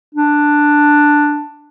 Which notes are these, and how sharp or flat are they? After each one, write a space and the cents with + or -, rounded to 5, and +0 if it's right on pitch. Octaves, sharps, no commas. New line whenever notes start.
D4 +5